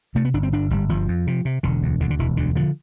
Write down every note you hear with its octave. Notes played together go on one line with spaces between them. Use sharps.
C3 A3
B3
G1 D4
C4
G1 D4
G1 G3
G1 F3
F2
C3
C3
E1 D3
D2
D2 D3
D3
E1 E3
D2 D3
D3 F3